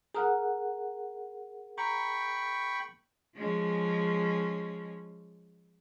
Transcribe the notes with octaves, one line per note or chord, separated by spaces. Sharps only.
G#4 A#4 F#5 A#5 D#6 F6
G5 A#5 B5 C#6
F3 G#3 C#4